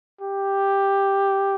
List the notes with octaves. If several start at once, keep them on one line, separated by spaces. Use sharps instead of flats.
G4